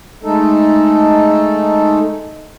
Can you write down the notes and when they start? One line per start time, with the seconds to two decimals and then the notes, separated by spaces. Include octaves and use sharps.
0.23 G#3 A3 D#4 A4